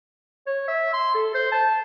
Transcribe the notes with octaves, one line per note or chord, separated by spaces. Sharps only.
C#5
E5
C6
A4
C5
A5